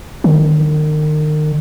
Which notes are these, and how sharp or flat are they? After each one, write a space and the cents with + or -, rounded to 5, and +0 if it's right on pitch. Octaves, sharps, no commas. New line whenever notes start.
D#3 -35